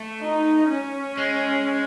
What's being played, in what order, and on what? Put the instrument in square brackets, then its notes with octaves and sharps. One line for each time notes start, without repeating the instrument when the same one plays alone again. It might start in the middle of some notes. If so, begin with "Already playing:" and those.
Already playing: [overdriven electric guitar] A3
[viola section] D#4
C#4
[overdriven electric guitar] G#3